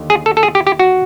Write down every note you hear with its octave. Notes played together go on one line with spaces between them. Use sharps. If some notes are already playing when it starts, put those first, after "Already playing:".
Already playing: D#2 D3
G#4
A4
A4
G#4
G4
G4
F#4